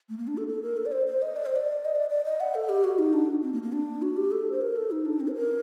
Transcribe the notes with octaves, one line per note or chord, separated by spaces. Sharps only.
A3
A#3
D4
A4
A4
A#4
A4
D5
C5
C5
D#5
D5
C5
D5
D#5
D5
D5
D#5
F#5
A4
G4
F#4
D#4
D4
C4
A#3
A#3
D4
F#4
G4
A4
C5
A#4
A4
D#4
D4
C4
C5
A#4